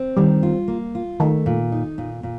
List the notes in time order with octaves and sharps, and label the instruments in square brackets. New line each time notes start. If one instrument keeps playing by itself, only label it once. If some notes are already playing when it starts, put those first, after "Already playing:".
Already playing: [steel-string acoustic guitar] C4
[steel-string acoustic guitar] D#3 [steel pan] G3
[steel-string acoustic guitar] F4
A#3
F4
[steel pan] D#3 [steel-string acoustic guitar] A3
[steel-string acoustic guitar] A#2
D#4
A#2
A#2